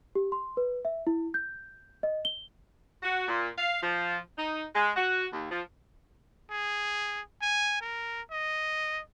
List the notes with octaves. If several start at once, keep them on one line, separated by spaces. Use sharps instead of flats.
G4
C6
B4
E5
E4
G6
D#5
G7
F#4
A#2
F5
F3
D#4
G#3
F#4
D#2
F3
G#4
G#5
A#4
D#5